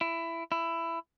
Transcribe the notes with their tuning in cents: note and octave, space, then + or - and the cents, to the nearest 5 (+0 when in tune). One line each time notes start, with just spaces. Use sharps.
E4 +15
E4 +15